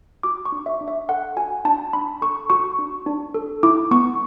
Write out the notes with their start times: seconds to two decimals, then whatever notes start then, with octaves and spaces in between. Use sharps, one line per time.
0.23 F#4 D6
0.46 C#6
0.52 D4
0.66 E5
0.81 D4
0.88 E5
1.09 A4 F#5
1.37 F#4 G#5
1.65 D4 A5
1.93 D4 B5
2.22 A4 C#6
2.50 F#4 C#6
2.79 D4
3.06 D4
3.35 A4
3.63 E4 D6
3.91 B3 C#6